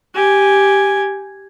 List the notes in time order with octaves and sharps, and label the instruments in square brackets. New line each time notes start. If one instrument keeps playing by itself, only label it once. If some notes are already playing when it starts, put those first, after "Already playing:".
[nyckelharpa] G4 G#5